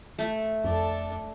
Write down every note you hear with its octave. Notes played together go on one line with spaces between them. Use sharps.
A3
F2 D4 A4